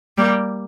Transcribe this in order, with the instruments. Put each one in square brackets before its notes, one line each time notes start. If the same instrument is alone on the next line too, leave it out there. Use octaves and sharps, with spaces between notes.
[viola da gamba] G3 A#3